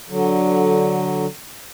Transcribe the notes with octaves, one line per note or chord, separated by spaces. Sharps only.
D3 F#3